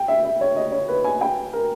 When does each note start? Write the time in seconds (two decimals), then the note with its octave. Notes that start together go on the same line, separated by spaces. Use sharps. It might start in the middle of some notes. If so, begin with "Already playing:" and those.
Already playing: G5
0.08 E5
0.24 E5
0.41 C#5
0.56 D#5
0.72 C#5
0.88 B4
1.04 G#5
1.21 G5
1.53 A#4